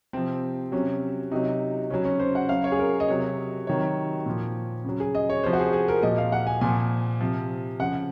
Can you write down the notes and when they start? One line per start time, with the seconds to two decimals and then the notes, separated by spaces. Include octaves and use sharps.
0.13 C3 F3 C4
0.72 C3 F#3 C#4
1.31 C3 F#3 D#4
1.90 C#3 F#3 C#4
2.05 C#4
2.20 C5
2.35 F#5
2.49 C#3 F#3 F5
2.64 C#5
2.72 G#4
2.79 A#4
3.00 D#5
3.08 C3 F#3 C#5
3.67 C3 D#3 F#3 C#5
4.26 A#2 F3
4.84 C#3 F#3
5.00 G#4
5.15 D#5
5.29 C#5
5.44 C3 F3 C5
5.53 F#4
5.59 G#4
5.73 G#4
5.88 A#4
6.03 A#2 F3 D#5
6.18 F5
6.32 F#5
6.47 G#5
6.61 A#2 F3 G#5
7.20 C3 F3
7.79 C#3 F3 F#5